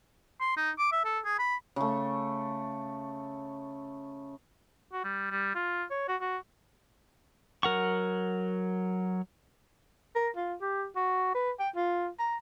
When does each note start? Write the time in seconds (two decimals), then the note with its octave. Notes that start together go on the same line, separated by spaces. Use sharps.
0.41 C6
0.57 D#4
0.79 D6
0.92 E5
1.05 A4
1.25 G#4
1.39 B5
1.76 C#3 A3
4.92 F#4
5.04 G3
5.31 G3
5.55 F4
5.90 C#5
6.08 F#4
6.21 F#4
7.63 F#3 A#4 F#5 C#6
10.15 A#4
10.36 F4
10.61 G4
10.96 F#4
11.34 B4
11.59 G5
11.76 F4
12.19 A#5